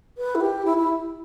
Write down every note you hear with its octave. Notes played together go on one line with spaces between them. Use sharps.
B4
E4
G4
E4
E4